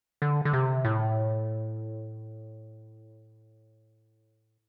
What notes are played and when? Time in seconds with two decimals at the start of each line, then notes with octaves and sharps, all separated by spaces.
0.22 D3
0.45 D3
0.53 C3
0.85 A2